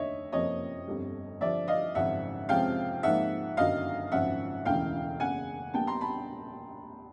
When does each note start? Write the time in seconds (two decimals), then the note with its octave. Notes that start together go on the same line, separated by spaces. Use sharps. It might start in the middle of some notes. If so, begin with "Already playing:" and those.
Already playing: F1 D#2 D3 C#5 D#5 E5
0.32 F#1 F2 C3 F3 A#3 C#5 D#5
0.87 G1 F2 D3 G3
1.41 G2 D3 F3 D5 E5
1.68 D#5 F5
1.95 G#1 F#2 C#3 F3 E5 F#5
2.49 F2 C3 F3 G#3 C#4 F5 G5
3.03 G#2 F3 A#3 D#4 E5 F#5
3.57 G1 F#2 D#3 F#3 D#5 F5
4.12 G#1 F#2 C#3 F3 E5 F#5
4.65 E1 D2 C#3 E3 F5 G5
5.20 F#1 E2 C#3 F#5 G#5
5.74 A#1 A#2 G3 B3 G5 A5
5.87 A#5 C6
6.01 A5 B5